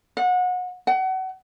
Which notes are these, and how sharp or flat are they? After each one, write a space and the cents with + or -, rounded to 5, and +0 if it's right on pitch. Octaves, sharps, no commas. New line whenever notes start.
F#5 -30
F#5 +30